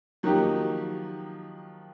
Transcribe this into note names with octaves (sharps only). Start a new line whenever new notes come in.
D#3 F3 F#3 A#3 D#4 G4